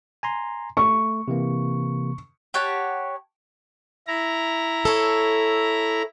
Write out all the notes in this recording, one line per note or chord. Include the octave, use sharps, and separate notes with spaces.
G#5 A#5 C6
A3 C#6
C3 E3 A#3
G4 C#5 F#5 A5
E4 A#5
A4 C#5